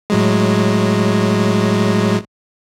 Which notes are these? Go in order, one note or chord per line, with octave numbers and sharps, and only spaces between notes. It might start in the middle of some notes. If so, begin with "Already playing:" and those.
A2 F#3 G#3